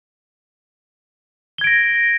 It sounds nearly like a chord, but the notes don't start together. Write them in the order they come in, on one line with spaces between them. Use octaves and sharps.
G7 G#6 D7 A#6